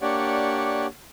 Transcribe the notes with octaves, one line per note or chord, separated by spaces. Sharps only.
A#3 D4 G4 C#5 D5 F#5